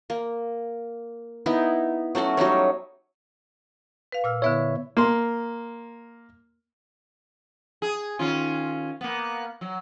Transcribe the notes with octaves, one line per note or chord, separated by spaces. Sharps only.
A#3
B3 D#4 E4
F#3 A3 C#4 F#4
F#3 G3 D#4 C#5
B4 F5
A#2 E6 F6
D3 B3 E4 C#5 E5
A#3 C6
G#4
D#3 C#4 F4
A#3 B3
F#3